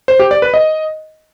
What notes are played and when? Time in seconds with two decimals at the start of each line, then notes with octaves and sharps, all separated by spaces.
0.08 C5
0.20 G4
0.31 D5
0.42 B4
0.54 D#5